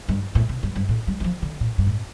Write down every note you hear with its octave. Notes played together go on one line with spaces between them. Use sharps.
G2
A2
C3
G2
G2
A2
G3
G3
F3
D3
A2
G2
A2